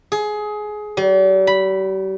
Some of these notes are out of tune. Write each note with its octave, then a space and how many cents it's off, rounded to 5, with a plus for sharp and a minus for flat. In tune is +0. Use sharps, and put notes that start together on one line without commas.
G#4 +20
G3 -40
B5 -5